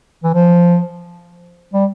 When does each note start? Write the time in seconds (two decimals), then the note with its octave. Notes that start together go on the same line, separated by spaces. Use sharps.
0.24 E3
0.34 F3
1.73 G3